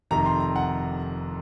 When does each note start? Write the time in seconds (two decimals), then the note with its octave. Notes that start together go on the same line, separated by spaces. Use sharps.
0.11 F1 F2 C3 D#3 A#5
0.26 C6
0.40 A#5
0.56 F#5